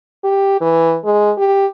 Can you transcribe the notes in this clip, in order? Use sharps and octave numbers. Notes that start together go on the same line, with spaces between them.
G4
E3
G#3
G4